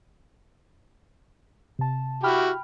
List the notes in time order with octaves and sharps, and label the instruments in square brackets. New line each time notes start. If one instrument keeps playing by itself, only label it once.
[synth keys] C3 A5
[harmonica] E4 F#4 G4 [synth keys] G5 B5 F6